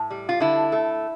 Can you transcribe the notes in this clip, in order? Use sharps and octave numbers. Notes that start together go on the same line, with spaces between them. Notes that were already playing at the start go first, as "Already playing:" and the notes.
Already playing: A2
G3
F4
D3 E4
A3